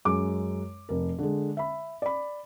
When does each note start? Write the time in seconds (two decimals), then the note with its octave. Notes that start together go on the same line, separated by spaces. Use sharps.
0.05 F#2 G#3 D6
0.89 F1 A#4
1.19 D3 G#3
1.57 E5 B5
2.02 D5 B5